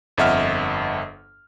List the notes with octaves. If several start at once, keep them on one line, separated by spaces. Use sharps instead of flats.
G1 F2 D#5 E5 F#5 F6